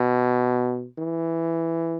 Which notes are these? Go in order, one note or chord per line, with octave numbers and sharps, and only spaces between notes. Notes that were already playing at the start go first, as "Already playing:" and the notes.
Already playing: B2
E3